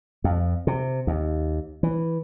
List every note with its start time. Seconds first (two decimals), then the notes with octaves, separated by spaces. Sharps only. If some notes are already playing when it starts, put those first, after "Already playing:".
0.24 F2
0.67 C3
1.07 D#2
1.83 E3